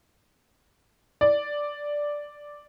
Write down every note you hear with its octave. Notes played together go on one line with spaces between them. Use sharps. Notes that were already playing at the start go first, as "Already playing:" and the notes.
D5